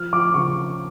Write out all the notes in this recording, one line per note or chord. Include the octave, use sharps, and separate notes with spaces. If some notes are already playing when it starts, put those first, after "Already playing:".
Already playing: F3 F6
F3 D6
C#3 C#6